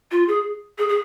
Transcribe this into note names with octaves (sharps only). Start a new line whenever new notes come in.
F4
G#4
G#4
G#4